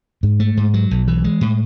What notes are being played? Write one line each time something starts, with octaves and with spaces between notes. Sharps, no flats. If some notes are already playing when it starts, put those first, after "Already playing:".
G#2
A3
G#2
F#3
B1
E3
G#3
A2